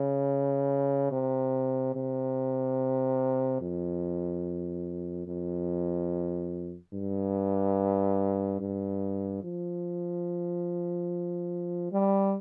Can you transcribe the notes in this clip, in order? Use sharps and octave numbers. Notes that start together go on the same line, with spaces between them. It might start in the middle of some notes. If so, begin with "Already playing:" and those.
Already playing: C#3
C3
C3
F2
F2
G2
G2
F3
G3